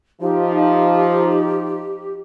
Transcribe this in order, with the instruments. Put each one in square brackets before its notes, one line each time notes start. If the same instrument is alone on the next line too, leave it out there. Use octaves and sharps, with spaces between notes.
[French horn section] F3 D#4 [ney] G4